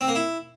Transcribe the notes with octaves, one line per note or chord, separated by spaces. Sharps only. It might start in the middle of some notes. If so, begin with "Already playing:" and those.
C4
A#3
E4